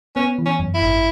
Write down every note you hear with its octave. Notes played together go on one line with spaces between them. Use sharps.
B3 C#4
E3
C#4
F#2
E4
G#1